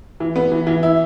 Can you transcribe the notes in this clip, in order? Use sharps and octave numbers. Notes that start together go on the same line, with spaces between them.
E3
B3
E3
E3
E4